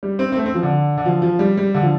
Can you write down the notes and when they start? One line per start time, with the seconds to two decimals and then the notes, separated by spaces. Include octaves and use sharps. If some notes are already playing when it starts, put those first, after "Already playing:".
0.03 G3
0.19 C4
0.32 C4
0.36 A3
0.46 C4
0.54 F3
0.63 D3
0.98 D3
1.06 F3
1.22 F3
1.39 G3
1.57 G3
1.74 D3
1.83 F3